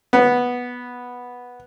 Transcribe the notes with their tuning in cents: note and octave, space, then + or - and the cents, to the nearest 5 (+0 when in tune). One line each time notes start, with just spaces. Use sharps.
B3 -5